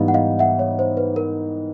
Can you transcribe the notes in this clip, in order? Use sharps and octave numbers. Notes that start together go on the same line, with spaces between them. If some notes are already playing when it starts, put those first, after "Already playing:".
Already playing: G#2 E3 G3 B3 D#4 D#5 F5
F#5
D#5 F5
E5 F#5
C#5
C5
B4
A#4